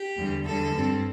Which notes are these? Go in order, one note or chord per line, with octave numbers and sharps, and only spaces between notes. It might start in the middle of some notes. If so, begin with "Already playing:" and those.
Already playing: G4
E2 D3 G3
E2 D3 G3 A4
G2 G3 C4